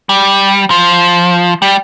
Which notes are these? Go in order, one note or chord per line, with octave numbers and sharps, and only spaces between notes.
G3
F3
G3